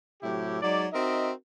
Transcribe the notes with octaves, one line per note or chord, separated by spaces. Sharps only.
A2 C3 F#3 E4 G4
F#3 G#3 D#4 D5
C4 D#4 F#4 A#4 D#5 E5